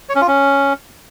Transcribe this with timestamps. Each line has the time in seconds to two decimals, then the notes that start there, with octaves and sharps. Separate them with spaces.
0.09 C#5
0.15 C#4
0.21 F4
0.28 C#4